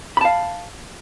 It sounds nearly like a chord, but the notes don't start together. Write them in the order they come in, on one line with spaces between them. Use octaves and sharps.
B5 A5 F5